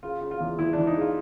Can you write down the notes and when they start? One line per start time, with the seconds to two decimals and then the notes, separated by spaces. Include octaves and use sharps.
0.03 C#3 F4
0.21 C#3
0.31 F4
0.40 E2
0.59 E2 E4
0.73 E3 D4
0.87 D#4
0.96 C#3 F4